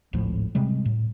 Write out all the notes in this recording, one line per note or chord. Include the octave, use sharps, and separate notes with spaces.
G#1 D2 A2 F3
C3 G3 G#3
A2